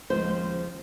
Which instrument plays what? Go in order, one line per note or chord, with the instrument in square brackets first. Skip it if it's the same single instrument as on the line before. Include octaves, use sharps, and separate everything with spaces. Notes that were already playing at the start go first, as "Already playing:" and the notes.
[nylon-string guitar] D#2 C#3 F3 G#3 C5